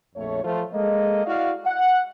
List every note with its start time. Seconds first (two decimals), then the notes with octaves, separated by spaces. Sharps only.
0.16 A#1 F2 A3 C#5
0.44 F3 A3 F4 A4 C5
0.74 G#3 A#3 A4 D#5
1.26 E4 F#4 D5 F5
1.66 F#5